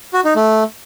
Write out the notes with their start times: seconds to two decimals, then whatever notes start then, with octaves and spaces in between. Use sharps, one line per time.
0.14 F#4
0.25 D#4
0.36 A3